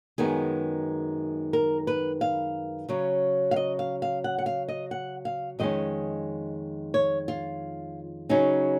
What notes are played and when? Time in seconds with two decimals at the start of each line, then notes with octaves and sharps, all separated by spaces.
0.18 F#2 D#3 G#3 B3 G#4
1.53 A#4
1.87 B4
2.21 F5
2.89 C#3 F#3 C#4
3.51 F5
3.56 D#5
3.79 F5
4.02 F5
4.24 F#5
4.38 F#5
4.46 F5
4.69 D#5
4.91 F#5
5.25 F5
5.59 F2 D#3 G#3 C#4 D#5
6.94 C#5
7.28 F4
8.29 C#3 F#3 C#4 D#4